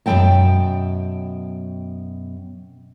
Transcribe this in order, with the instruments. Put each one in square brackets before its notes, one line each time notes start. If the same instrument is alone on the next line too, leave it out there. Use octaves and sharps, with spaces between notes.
[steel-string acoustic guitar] F#2 B2 G#3 C4 G5 A5